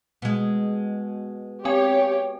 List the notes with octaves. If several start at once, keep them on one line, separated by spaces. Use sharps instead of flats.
B2 G#3
C4 G4 C#5 G#5